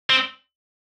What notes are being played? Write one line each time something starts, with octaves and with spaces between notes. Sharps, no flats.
C4